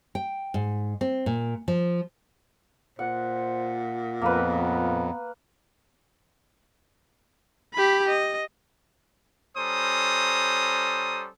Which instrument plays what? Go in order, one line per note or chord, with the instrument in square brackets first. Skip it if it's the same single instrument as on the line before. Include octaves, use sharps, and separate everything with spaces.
[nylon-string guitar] G5
G#2
C4
A#2
F3
[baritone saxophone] A#2 [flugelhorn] C5 [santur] F#5
[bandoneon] F2 [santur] A#3 B4 [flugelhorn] B3
[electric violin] G4 B5
D#5
[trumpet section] G3 C#4 A4 C5 A#5 D#6